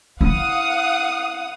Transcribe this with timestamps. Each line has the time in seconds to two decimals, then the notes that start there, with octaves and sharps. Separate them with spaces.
0.21 E4 F5 F#5 D#6